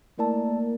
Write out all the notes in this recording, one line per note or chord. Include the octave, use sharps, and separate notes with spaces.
A3 A#3 E4 A#4 D5 A5